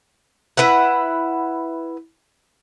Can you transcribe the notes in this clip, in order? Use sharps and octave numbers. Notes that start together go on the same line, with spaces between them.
E4 B4 E5 F#5